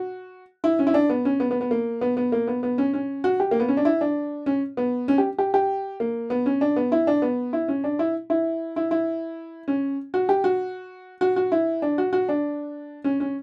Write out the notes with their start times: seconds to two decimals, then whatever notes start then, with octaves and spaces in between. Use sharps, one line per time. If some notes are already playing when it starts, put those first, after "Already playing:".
Already playing: F#4
0.64 E4
0.79 C#4
0.87 E4
0.94 D4
1.10 B3
1.25 C#4
1.40 B3
1.51 B3
1.61 B3
1.71 A#3
2.01 B3
2.17 B3
2.32 A#3
2.48 B3
2.63 B3
2.78 C#4
2.94 C#4
3.24 F#4
3.40 G4
3.51 A#3
3.60 B3
3.68 C#4
3.77 D4
3.85 E4
4.01 D4
4.46 C#4
4.77 B3
5.08 C#4
5.18 G4
5.38 G4
5.54 G4
6.00 A#3
6.30 B3
6.46 C#4
6.61 D4
6.76 B3
6.92 E4
7.07 D4
7.22 B3
7.53 E4
7.68 C#4
7.84 D4
7.99 E4
8.30 E4
8.76 E4
8.91 E4
9.68 C#4
10.14 F#4
10.29 G4
10.44 F#4
11.21 F#4
11.36 F#4
11.52 E4
11.82 D4
11.98 F#4
12.13 F#4
12.29 D4
13.04 C#4
13.20 C#4